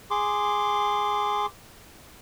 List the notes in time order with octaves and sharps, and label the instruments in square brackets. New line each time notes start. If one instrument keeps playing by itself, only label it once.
[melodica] G#4 C6 D6